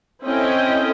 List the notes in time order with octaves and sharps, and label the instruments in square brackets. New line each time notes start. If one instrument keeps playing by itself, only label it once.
[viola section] C4 C#4 E4 A4 D#5 G5